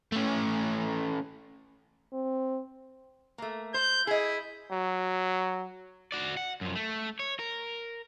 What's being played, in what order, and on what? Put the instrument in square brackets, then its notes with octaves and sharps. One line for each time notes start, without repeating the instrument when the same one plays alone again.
[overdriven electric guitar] A3 C#4
[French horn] C4
[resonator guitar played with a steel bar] A3 A#3
[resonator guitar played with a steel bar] C5 [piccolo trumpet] G6
[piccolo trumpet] E4 [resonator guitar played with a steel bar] G#4 D#5
[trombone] F#3
[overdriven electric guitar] F#4 D5
F#5
F#2 F3
A3
C#5
A#4